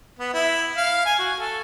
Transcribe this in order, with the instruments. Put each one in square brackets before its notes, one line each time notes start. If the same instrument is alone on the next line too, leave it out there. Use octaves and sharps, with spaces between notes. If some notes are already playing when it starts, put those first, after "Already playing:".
[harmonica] B3
E4
F5
G#5
F#4
A4